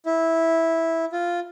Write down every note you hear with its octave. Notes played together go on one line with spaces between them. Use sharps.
E4
F4